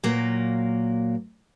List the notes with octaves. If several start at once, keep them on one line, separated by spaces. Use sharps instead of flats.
A#2 F#3 A#3